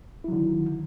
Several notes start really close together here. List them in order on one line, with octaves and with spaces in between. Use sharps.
E4 F#3 D3 D#3